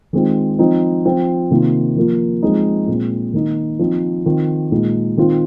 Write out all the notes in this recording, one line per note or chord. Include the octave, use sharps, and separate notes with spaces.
D#3 G#3 C4 F4
F3 C4 D#4
F3 C4 F4
C3 D#3 A#3 F4
F3 A#3 F4
F3 G#3 C4 D#4
A#2 G#3 C4
D#3 A#3 D#4
F3 C4 D#4
D#3 C4 F4
A#2 G#3 D#4
D#3 C4 F4